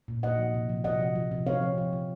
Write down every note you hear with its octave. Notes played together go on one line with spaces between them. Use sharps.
A#2
A#2 D#5 F#5
F3
C3
F3
C3 D#5 F#5
F3
F3
C3
C4 C#5 F5
F3
F3
F3